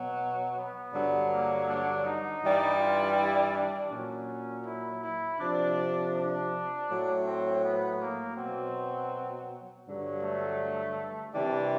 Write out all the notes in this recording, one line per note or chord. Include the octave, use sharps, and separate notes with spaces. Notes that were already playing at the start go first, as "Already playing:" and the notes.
Already playing: B2 F#3
B3
G2 D3 F#3
A#3
D4
D#4
G2 E3 G3
F4
E4
D4
A#2 F#3 C#4
E4
E4
C3 F3 D4
D4
A2 F#3
C4
B3
A#3
B2 F#3 C4
G2 D3 F#3
A3
C3 E3 G3 D4